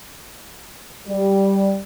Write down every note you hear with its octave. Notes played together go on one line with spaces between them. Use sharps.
G3